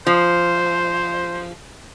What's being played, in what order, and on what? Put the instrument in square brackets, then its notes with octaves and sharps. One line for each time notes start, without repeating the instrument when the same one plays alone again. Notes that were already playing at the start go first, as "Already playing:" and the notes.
[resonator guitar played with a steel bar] F3 [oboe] C5